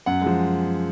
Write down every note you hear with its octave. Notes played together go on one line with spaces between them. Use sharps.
F#2 F#5
F3 G#3